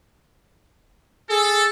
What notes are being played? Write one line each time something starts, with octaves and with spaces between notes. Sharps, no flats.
G#4 A4